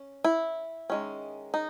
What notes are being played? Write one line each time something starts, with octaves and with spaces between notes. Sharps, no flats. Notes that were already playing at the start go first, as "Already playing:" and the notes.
Already playing: C#4
E4
D#3 G#3 C#4
D#4